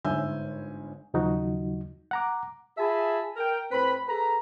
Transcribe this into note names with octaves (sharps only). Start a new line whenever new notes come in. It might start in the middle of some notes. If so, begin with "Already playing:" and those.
G1 G#2 E5 G#5 E6 G6
D#2 C#3 F3 F#3 D#4 F#4
F#5 A#5 D6
F4 G#4 E5 G#5 A5 B5
A#4 G5
A2 C4 B4 B5
G#4 A4 B4 A#5